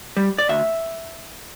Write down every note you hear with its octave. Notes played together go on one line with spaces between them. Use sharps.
G3
D5
D2 E5